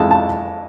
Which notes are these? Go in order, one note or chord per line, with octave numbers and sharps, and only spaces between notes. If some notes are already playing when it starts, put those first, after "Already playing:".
Already playing: F2 E3 G#3 A5
A5